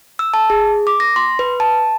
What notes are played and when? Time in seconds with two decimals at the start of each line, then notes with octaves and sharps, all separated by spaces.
0.19 E6
0.34 A5
0.50 G#4
0.87 D6
1.00 A#6
1.16 C6
1.39 B4
1.60 A5